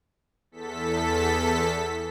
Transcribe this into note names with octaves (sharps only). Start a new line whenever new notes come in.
E2 A4 B6